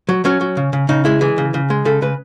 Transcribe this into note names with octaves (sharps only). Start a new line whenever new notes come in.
F#3
F#3 C#4
F#3
C#3
C#3
C#3 D#4
G#3 E4
E3 G#4
C#3
C#3
G#3
C#3 A4
C#3 B4